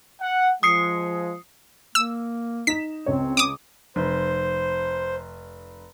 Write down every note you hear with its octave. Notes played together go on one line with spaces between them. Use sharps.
F#5
F3 G#3 D#6 C7 C#7
A#3 E6
D#4 B6 E7
C#2 C4 C#5
D6 D#6
F1 C5